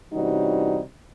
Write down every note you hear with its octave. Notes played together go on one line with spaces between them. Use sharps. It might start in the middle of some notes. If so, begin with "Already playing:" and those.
C3 E3 G3 C#4 D#4 F#4